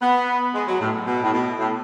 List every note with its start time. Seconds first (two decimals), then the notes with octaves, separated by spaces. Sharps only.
0.02 B3
0.54 G#3
0.68 F#3
0.80 A2
1.06 B2
1.23 A2
1.33 B2
1.59 A2